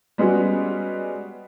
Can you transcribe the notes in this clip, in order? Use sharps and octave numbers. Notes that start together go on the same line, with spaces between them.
G3 G#3 B3 C#4 F#4